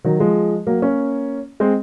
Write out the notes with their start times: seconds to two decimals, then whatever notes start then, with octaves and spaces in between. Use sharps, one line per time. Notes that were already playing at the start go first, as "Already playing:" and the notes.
0.05 D#3 F#3
0.20 F3 G#3
0.67 F#3 A#3
0.82 A#3 C#4
1.60 G#3 C4